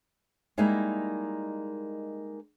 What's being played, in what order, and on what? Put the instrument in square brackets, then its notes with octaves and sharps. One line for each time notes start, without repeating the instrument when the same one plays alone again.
[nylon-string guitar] G3 G#3 A#3 D#4 E4 A#4